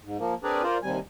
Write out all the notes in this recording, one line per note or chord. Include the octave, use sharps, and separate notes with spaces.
G#2
F3 A#3
C4 D4 G#4 A#4 B4 D5
F4 A#4 C5 D5
D#2 C3 G3 G#5